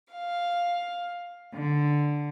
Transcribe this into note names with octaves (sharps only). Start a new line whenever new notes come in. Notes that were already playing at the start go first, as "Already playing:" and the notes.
F5
D3